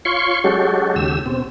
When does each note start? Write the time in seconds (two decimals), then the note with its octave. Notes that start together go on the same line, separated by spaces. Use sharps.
0.05 F4 C#5 C6 C#6
0.44 F#3 G#3 C#4 F#4 G4 A4
0.96 D#2 C#3 G4 E6
1.26 B2 C4